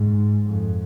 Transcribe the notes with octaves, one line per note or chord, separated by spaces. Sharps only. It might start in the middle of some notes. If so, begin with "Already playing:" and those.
Already playing: G#2
F2